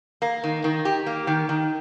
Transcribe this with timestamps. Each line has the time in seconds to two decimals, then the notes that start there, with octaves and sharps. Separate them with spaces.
0.22 A#3
0.44 D#3
0.64 D#3
0.85 G4
1.06 A#3
1.27 D#3
1.49 D#3